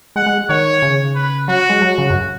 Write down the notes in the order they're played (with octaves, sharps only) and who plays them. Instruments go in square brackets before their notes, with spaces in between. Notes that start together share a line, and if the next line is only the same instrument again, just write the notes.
[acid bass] G#3 [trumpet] F#5
[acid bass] G#3
[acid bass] D#3 [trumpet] C#5
[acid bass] C#3
[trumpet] B4
[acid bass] F#3 [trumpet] F#4
[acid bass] G#3
F#3
C#3
F#2